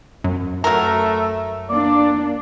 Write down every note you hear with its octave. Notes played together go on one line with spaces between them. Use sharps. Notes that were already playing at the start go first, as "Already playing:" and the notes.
F#2
F#3 A3 A#4
A#3 D4 D5